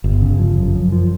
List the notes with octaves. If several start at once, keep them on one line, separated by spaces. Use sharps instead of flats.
G1
C#3
F3
F#2
F#2
F3